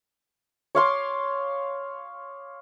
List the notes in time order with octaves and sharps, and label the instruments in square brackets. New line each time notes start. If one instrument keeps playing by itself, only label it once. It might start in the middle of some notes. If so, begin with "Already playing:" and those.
[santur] C#5 F5 C6 D6